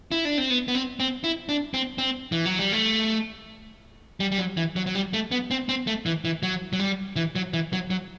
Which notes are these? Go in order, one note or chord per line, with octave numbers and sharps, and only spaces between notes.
E4
D4
C4
B3
B3
C4
C4
E4
D4
C4
C4
E3
F#3
G3
A3
G3
G3
F#3
E3
F#3
F#3
G3
A3
B3
C4
C4
A3
E3
E3
F#3
F#3
G3
E3
F#3
E3
F#3
F#3